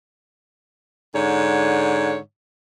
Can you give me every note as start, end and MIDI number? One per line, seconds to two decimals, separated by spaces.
1.13 2.16 44
1.13 2.16 50
1.13 2.16 73